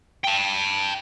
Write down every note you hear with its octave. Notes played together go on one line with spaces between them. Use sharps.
G5 A5